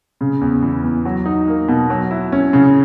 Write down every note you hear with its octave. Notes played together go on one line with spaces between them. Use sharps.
C#3
E2
E3
E2
F#3
D#4
A#3
B2
F#3
E4
C#4
C#3